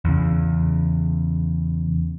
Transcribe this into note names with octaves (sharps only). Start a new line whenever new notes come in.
E2 C#3